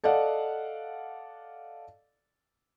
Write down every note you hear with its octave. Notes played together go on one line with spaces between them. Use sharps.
A4 D5 D#5 F5 F#5